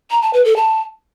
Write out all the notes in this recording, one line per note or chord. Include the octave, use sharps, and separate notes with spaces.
A#5
A5
B4
A4
A5